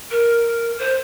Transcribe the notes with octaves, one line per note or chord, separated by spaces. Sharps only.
A#4
C5